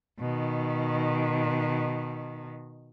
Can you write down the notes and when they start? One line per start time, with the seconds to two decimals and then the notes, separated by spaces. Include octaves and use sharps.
0.20 B2 D#3